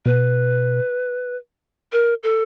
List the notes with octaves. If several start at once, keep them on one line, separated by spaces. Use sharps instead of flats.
B2 B4
A#4
A4